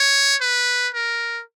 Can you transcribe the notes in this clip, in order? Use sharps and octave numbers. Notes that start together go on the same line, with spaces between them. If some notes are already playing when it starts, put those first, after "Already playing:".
Already playing: C#5
B4
A#4